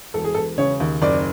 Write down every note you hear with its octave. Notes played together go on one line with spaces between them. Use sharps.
E1 A4
G#4
E1 A4
C#3 C#5
D#2
F#1 D5